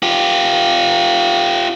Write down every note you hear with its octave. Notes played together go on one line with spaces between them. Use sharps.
F4 G4